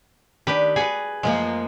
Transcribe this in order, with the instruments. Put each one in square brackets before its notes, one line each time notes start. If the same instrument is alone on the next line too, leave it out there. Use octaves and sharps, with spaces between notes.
[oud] D#3 D4 [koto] G4 B4
[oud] F#4 [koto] G#4 B4
[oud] F#2 F3 A#3 [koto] G#3